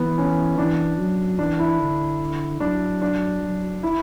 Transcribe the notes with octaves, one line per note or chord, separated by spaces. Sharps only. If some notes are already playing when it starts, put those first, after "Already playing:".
Already playing: E3 B3
C#4
E3 D4
F#3
E3 D4
E4
D3
F#3 D4
D4
F#3
E4